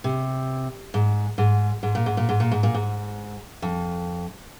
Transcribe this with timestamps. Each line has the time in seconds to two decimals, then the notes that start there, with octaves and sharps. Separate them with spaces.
0.04 C3
0.94 G#2
1.38 G#2
1.83 G#2
1.95 A#2
2.06 G#2
2.17 A#2
2.29 G#2
2.40 A#2
2.51 G#2
2.63 A#2
2.74 G#2
3.62 F2